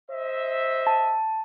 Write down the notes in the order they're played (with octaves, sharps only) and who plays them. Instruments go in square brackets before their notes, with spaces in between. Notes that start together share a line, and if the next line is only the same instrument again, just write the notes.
[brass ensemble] C5 D#5 E5
[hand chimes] A5